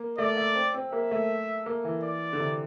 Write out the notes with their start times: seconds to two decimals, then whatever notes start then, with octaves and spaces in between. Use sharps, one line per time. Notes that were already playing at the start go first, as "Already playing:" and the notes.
Already playing: A#3
0.18 A3 D5
0.37 A3
0.55 C4
0.74 C4
0.92 A#3 E5
1.11 A3
1.66 A#3
1.84 E3
2.03 D5
2.33 D3
2.40 C3